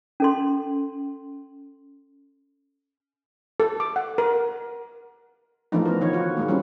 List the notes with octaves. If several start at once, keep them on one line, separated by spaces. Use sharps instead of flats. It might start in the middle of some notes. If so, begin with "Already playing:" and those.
C#4 A4 C6
A4
D6
F#5
A#4
E3 F3 A3 B3 D4 D#4
B3 A#4
D#3 F3 C#5
F4 F#4
D#3 G#3 A#3
G3 C4 C#4 E4